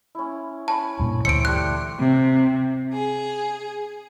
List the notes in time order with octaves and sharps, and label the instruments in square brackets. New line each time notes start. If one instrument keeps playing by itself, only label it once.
[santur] C#4 E4
[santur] C#4 C#5 B5 [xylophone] A5
[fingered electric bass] G2 A#2
[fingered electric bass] D2 E3 [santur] C4 C#5 E5 [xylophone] C#7 D7
[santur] G3 A3 G4 [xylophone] F#6
[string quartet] C3
G#4